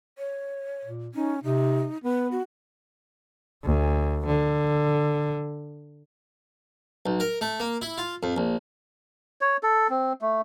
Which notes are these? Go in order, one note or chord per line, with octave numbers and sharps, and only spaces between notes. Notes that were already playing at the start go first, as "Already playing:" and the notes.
C#5
A#2
C#4 D#4
C3 D#4
B3 B4
F#4
D2
D3
B1
A#4
A3
A#3
E4
F4
F2
A#1
C#5
A4
C4
A3